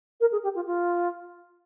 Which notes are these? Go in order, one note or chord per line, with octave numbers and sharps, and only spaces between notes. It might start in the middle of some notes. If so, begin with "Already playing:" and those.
A#4
G#4
G4
F4
F4